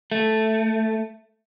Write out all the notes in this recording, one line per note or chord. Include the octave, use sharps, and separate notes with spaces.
A3